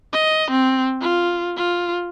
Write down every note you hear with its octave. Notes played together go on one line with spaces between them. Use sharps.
D#5
C4
F4
F4